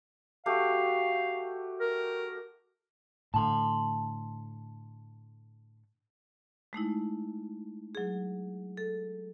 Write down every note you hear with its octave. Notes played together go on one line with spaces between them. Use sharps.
A3 F#4 G4 F5
A#4
A2 D3 A3 A5 C6
G#3 A3 D#4 E4
F#3 G#4
A4